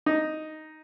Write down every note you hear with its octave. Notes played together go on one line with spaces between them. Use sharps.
D#4